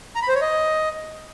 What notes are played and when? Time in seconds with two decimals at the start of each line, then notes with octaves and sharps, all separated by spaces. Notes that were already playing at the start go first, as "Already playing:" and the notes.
0.15 A#5
0.22 B5
0.28 C5
0.35 C#5
0.42 D#5